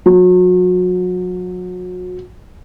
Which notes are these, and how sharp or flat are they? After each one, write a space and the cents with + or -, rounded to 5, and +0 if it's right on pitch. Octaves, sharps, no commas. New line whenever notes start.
F#3 -30